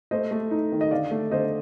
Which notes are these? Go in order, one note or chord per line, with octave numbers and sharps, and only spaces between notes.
A3 C5 D#5
A3
D#4
D#3
D#5
D3 D5 F5
A3
D3 C5 D#5